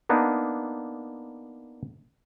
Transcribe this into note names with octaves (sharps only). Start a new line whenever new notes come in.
A#3 B3 D4 D#4